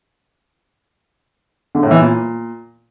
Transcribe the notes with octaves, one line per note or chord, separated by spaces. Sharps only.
D3
A2
E3
A#2